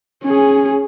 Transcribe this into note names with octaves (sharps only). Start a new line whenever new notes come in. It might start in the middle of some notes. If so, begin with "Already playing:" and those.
C#4 G#4